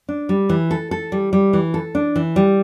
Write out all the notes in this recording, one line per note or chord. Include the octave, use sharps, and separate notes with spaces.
D4
G3
E3
A4
A4
G3
G3
E3
A4
D4
E3
G3